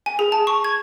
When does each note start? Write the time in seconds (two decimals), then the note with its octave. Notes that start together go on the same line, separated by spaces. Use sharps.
0.06 G#5
0.19 G#4
0.32 A5
0.47 C#6
0.64 G#6